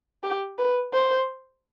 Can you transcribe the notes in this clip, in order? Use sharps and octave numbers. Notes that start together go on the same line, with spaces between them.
G4
B4
C5